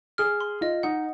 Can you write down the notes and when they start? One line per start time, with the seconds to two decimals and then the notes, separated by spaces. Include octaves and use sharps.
0.18 G#4 F6
0.41 C6
0.61 F4 D#5
0.83 D#4 F#5